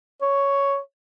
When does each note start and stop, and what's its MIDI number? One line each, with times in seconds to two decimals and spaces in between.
0.22 0.78 73